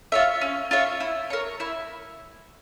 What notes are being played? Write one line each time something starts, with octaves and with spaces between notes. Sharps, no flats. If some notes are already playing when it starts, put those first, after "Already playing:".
F4 C#5 E5
C#4
F4 C#5 E5
E4
A#4 C#5
E4